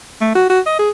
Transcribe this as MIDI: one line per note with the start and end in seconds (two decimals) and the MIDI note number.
0.21 0.33 57
0.35 0.48 66
0.50 0.60 66
0.66 0.78 75
0.79 0.90 68